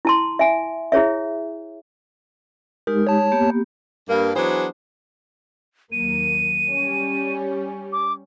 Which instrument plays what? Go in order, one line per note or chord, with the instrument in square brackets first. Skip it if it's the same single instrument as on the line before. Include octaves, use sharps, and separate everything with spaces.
[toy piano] E4 A5 C6
E5 G#5
E4 G#4 C#5 E5
[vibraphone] G#3 D#4 G4 [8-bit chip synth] A#4
[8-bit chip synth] C#5 A5
[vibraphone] A#3 B3 G4
[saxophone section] G2 A#3
E3 F#3 B3 D4 G#4 C5
[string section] D#2 F#3 A#3 [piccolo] D#7
[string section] G3 C#4
[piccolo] D6